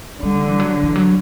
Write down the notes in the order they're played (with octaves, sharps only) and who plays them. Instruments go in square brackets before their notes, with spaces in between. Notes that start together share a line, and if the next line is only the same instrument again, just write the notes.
[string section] D3 [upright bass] G3
[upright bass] E3
F#3
E3
F#3